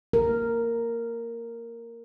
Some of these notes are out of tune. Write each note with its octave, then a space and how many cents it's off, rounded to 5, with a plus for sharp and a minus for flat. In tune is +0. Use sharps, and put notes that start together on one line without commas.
A#4 -5